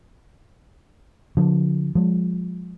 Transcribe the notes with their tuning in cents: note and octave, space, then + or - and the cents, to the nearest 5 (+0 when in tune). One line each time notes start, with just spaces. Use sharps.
D3 -25 F3 +30
F3 +30 G#3 +0